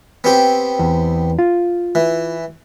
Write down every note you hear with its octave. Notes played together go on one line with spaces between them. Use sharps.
B3 C4 G4
E2
F4
E3